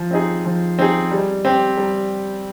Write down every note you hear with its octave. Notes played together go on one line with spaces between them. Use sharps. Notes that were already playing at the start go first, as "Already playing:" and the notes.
Already playing: F3
C4 D#4 G#4
F3
C4 D#4 G#4
G3
C4 G4
G3